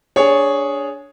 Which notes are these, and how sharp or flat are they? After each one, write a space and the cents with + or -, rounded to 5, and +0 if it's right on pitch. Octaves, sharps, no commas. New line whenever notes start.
D4 -15 G#4 +0 C#5 +0